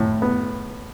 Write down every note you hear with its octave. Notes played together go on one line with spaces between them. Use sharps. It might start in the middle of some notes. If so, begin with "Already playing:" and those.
Already playing: A2
B3